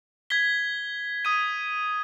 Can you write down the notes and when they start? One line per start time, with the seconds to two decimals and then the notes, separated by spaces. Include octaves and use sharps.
0.30 G#6 B6 G7
1.25 D#6 G#6 D#7